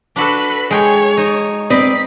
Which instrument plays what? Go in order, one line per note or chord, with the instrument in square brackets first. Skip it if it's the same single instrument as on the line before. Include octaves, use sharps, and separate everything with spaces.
[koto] D4 F#4 A4 [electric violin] B4 B5
[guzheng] G#3 G5 [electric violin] C#5
[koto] D#4
[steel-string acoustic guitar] C4 B4 D5 [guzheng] D#5 [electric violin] B6